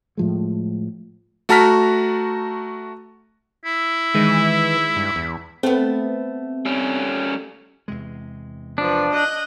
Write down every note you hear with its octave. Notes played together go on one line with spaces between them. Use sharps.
A2 F3 G#3
A3 F#4 A5 A#5 F6 B6
E4
D#3 E3 G#3
G2
E2
A3 B3 C4
G3 C#4
E2 C3 G#3
F3 D4 B4
D#5 F#6 G6